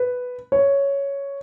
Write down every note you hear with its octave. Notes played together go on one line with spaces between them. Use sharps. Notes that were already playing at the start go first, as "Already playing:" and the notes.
Already playing: B4
C#5